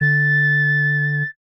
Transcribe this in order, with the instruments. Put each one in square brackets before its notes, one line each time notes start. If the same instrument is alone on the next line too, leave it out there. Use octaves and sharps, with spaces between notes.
[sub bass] D3 [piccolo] A6